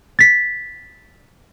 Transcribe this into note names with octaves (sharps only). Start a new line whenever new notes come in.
A6 B6